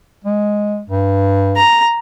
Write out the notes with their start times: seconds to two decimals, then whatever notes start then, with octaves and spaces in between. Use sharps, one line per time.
0.24 G#3
0.90 G2
1.57 A#5